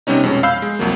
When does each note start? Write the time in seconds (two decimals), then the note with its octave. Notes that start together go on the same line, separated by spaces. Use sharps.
0.07 C3 G3 B3 C#4 D#4
0.23 F2 B2 G#3 C#4
0.43 F5 B5 E6 G6 C7
0.62 G#3
0.79 C2 F2 F#3 A#3